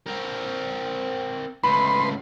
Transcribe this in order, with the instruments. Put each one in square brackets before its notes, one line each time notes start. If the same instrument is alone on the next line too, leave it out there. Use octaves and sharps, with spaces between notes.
[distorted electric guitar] C4 A#4
[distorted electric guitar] C#2 A2 [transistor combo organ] B4 C6 [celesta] B5